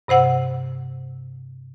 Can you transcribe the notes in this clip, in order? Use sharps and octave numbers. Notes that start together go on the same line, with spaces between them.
G2 C3 C5 F#5 E6